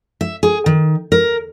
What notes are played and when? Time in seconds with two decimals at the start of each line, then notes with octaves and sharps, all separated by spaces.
0.21 E5
0.43 G#4
0.66 D#3
1.12 A#4